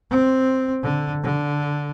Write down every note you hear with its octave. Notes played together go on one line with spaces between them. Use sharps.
C4
D3
D3